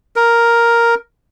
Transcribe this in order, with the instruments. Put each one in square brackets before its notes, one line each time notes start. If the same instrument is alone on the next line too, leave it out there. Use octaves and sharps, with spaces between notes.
[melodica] A#4